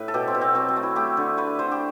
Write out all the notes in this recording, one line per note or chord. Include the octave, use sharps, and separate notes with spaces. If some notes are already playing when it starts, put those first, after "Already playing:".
Already playing: A2 B4
A4
B2 G4
C4
B2
C4
F#3 C4
C4
A3
E4
A3 G4
D3
A3 B4
D3 C5
G4